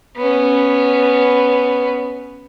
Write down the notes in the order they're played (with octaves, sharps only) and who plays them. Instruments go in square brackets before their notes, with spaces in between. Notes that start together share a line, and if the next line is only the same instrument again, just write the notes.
[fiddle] B3 C#4